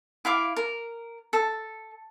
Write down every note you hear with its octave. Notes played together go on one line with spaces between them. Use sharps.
E4 F5 D6
A#4
A4